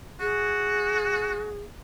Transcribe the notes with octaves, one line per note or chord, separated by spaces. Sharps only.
F#4 G#4